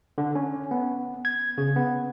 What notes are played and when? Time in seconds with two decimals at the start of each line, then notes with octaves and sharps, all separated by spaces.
0.18 D3
0.35 C#4
0.71 B3
1.25 G#6
1.58 C#3
1.76 B3